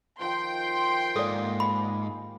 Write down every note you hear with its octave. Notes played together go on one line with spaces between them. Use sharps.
D#3 F3 G5 C6
G#2 G#3 A#3 G4 A4 D5
B5